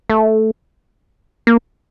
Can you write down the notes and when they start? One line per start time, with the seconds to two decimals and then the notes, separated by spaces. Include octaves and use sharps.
0.10 A3
1.47 A#3